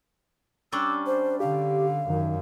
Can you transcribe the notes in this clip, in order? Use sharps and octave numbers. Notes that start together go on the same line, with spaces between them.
G3 C#4 D4 E6
C5
D3 G4 F5
F#2 D#3